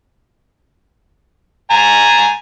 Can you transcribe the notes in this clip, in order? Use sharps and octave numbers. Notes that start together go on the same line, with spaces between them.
G#5 A#5